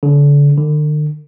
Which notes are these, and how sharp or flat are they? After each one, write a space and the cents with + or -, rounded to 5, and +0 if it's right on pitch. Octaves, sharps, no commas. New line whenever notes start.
D3 -35
D3 +45